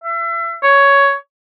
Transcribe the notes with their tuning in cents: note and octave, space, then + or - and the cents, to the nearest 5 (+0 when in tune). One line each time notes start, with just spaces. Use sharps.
E5 +35
C#5 +10